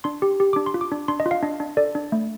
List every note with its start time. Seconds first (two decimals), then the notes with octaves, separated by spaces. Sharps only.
0.04 D4 C6
0.22 G4
0.40 G4
0.53 D4 D6
0.66 C6
0.74 F4
0.81 D6
0.92 D4
1.08 D4 C6
1.20 D#5
1.26 F4
1.31 F5
1.43 D4 D#5
1.60 D4
1.77 A4 D5
1.95 D4
2.12 A3